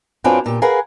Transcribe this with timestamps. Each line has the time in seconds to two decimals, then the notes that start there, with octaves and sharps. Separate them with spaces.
0.24 F#2 B3 C4 D4 F4 G#5
0.46 A#2 G4
0.62 G#4 A#4 B4 F5 F#5 G#5